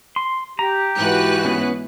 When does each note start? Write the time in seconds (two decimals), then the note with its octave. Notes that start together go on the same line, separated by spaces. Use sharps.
0.16 C6
0.59 G4 A#5
0.97 G#2 E3 F#4 B4 F#6
1.45 B3 C#4